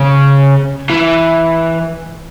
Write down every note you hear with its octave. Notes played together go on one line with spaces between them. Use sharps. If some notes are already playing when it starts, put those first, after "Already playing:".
Already playing: C#3
E3